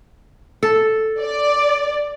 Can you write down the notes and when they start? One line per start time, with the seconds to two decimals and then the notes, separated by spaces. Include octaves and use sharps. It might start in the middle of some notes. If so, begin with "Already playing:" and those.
0.63 A4
1.20 D5